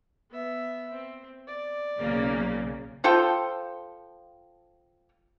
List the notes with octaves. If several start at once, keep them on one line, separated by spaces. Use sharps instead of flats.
B3 E5
C4
D5
B1 C#3 A#3
F3 F4 A4 G5